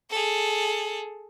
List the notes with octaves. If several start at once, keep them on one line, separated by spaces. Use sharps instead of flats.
G#4 A4